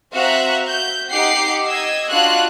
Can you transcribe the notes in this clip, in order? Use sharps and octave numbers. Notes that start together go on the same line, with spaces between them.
C4 F#4 E5 F5 A#5 F#6
G6
D#4 G4 F#5 D6 C7
D#5 E6 G#6
D4 F4 F#4 F5 F#6